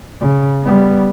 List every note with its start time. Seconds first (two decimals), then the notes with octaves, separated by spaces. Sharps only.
0.21 C#3
0.63 G3 B3